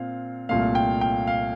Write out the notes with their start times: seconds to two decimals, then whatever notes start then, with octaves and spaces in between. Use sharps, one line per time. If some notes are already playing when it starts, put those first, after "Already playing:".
Already playing: A#2 C4 F5
0.49 C2 A#2 A3 F5
0.75 G5
1.01 G5
1.27 F5